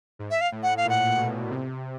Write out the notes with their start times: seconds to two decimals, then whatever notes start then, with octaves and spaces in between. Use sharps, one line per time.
0.19 G#2
0.31 E5
0.41 F5
0.52 A2
0.63 F#5
0.77 F5
0.85 A#2 F#5
1.17 B2
1.50 C3